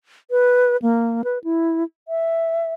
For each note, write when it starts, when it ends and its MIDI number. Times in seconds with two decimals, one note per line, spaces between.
0.31 0.77 71
0.82 1.22 58
1.24 1.38 71
1.44 1.84 64
2.08 2.74 76